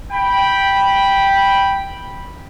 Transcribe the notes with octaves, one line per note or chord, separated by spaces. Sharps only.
G5 B5